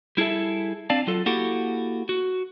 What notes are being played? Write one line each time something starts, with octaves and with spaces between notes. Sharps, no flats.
G3 E4 G#4 A4 E5
C4 D4 D5 F5 A5
F#3 F4 A4
A#3 E4 F#4 G4 A4
F#4